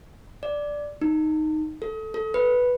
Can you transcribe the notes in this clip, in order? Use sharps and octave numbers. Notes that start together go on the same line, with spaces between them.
D5
D#4
A4
A4
B4